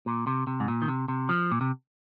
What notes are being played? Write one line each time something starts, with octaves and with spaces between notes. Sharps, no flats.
A#2
C3
C3
G#2
A#2
D#3
C3
C3
F3
A#2
C3